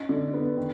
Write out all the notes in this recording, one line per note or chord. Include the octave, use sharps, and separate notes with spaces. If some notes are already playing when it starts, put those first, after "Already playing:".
Already playing: C#4 D#4
D3
B3
D#3